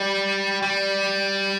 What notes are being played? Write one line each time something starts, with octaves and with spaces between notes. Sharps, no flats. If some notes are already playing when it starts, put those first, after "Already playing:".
Already playing: G3
G3